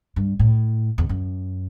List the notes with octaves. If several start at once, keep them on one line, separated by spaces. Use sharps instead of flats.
G2
A2
E2
F#2